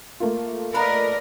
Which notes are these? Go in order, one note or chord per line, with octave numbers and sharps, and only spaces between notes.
A3 A#3 F4
D4 A#4 B4 D5 D#5 F5 A#5 B5